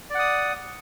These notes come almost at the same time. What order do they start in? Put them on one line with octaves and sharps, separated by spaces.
D5 F#5 D#6